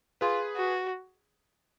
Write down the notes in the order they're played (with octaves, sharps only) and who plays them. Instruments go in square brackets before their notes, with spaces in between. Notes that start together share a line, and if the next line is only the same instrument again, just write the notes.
[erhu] F4 [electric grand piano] G#4 B4
[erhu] F#4